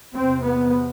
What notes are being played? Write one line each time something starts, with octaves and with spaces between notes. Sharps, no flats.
E2 C3 C4
B3